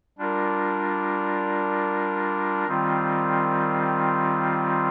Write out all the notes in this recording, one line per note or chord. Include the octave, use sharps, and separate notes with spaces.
G3 D4 F4 A#4
D#3 G3 C4 F4